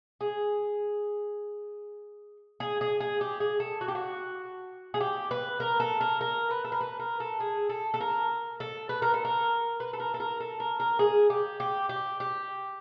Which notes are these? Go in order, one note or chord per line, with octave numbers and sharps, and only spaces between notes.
G#4
G#4
G#4
G#4
G4
G#4
A4
F#4
G4
F#4
G#4
G4
B4
A#4
A4
A#4
A#4
B4
A4
A#4
B4
A#4
A4
G#4
A4
A4
A#4
A4
B4
A#4
A4
A#4
B4
A4
A#4
A4
A#4
A4
A#4
A#4
G#4
G4
G4
G4
G4